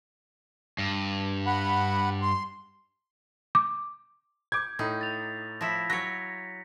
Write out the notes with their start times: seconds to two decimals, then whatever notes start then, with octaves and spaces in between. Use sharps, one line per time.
0.78 G2
1.47 F#5 B5
2.22 C6
3.55 D6
4.52 D6 G6 G#6
4.79 A2 D#4
5.01 A6 F7
5.61 F3 E4 A#6 B6
5.90 F#3 C#5 F#6 A#6 C#7